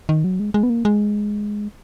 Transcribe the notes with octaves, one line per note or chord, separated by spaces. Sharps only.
D#3
F#3
G#3
G#3
B3
A#3
G#3